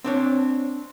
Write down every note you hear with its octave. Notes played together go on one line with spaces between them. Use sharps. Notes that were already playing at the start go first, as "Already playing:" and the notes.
C4 D4 C#5